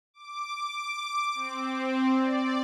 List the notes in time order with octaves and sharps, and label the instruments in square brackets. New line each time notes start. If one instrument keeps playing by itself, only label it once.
[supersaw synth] D6
D6
C4
D5